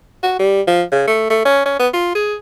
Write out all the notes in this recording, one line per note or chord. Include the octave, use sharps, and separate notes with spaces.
F#4
G3
F3
C#3
A3
A3
C#4
C#4
B3
F4
G#4